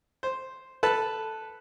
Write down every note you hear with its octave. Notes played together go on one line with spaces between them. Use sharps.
C5
A4 B4 A5